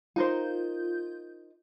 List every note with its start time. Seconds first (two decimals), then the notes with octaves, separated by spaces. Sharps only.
0.16 D#4 F4 A#4 C5 G6